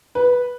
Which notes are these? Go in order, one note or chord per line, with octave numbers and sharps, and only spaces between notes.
B4